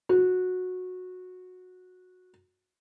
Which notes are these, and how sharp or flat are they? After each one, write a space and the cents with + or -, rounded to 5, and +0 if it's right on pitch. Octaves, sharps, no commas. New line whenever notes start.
F#4 -15